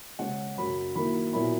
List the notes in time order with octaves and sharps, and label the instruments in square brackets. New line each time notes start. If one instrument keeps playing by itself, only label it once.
[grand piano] C#3 G#3 C#4 F#5
F#2 C#3 F#3 B5
D#3 F#3 A#3 E4 B5
A#2 F#3 B3 E4 B5